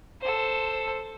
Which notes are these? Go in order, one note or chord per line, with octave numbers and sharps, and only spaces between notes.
A4 C5